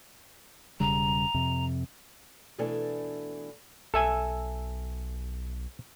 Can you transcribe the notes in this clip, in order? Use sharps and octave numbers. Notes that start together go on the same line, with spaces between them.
E1 C#3 G3 A#5
F2 C3
B2 E3 A3 D4 A4 G#5
B1 A4 E5 G#5